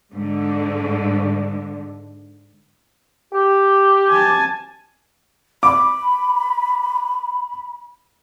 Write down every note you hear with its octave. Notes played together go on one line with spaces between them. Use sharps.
G#2 D3
G4
G#5 A5
B5 D6